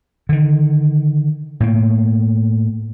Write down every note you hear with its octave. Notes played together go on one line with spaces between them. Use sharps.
D3 D#3
A2 A#3